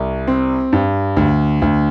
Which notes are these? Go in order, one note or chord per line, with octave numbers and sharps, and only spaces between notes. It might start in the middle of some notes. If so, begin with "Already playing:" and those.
Already playing: C2
C4
G2
D2
D2